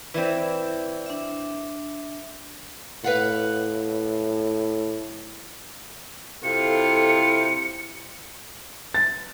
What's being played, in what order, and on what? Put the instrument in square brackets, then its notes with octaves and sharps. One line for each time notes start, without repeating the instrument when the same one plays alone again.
[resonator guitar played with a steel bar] E3 C4 [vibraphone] B4 D5 E5
[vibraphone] D4 E5
[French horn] A2 [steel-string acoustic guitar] B4 F5 F#5
[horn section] C3 F4 [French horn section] E4 A4 [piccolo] C#7
[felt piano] A6